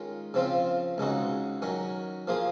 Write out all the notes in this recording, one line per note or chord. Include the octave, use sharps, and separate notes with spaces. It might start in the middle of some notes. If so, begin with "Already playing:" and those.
Already playing: D#3 G#3 C#4 F4
C#3 F3 C4 F4
C#2 C#3 G#3 D#4 F#4
D#3 F#3 C#4
F3 A#3 F4 G#4